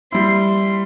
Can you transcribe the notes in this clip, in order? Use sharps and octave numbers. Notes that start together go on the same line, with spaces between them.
G3 E4 C6